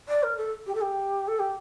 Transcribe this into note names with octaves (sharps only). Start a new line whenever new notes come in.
D5
A#4
A4
G4
A4
G4
A4
G4